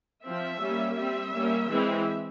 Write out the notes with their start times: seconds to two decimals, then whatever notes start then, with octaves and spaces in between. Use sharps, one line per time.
0.22 F3 C4 E5
0.60 G3 A#3 C#4
0.96 G3 C4 E5
1.32 G3 A#3 C#4
1.69 E3 G#3 C4